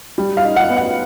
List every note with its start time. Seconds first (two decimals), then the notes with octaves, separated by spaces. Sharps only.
0.18 G3
0.37 F5
0.44 D#4
0.56 F#5
0.70 B3
0.76 F#5